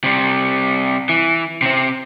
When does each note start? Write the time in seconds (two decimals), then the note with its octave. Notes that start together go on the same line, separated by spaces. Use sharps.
0.04 C3 G3
1.09 E3
1.62 C3 C4